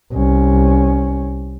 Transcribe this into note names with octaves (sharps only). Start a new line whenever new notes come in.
C2 C#4